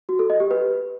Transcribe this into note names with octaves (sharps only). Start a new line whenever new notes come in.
F#4
A4
D#5
G4
B4